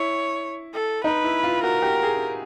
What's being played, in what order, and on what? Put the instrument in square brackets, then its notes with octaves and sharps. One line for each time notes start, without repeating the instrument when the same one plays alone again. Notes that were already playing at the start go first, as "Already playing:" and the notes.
Already playing: [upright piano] E4 [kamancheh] C#5
[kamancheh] A4
[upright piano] D#4 [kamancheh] B4
[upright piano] E4
F4
[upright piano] F#4 [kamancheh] A#4
[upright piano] G4
G#4